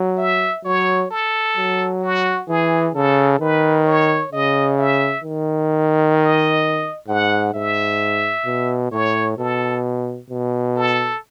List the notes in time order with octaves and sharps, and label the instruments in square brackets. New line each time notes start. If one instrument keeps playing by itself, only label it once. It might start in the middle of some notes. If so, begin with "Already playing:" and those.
Already playing: [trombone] F#3
[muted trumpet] E5
[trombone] F#3 [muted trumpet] C#5
[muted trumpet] A4
[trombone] F#3
[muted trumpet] F#4
[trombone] E3 [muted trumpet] G#4
[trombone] C#3 [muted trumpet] A4
[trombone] D#3 [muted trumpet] B4
[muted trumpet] C#5
[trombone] C#3 [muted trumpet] D#5
[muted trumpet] E5
[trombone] D#3
[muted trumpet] D#5
[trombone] G#2 [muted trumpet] F#5
[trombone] G#2 [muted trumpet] E5
[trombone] B2
[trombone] A2 [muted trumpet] C#5
[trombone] B2 [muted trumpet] A4
[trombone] B2
[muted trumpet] A4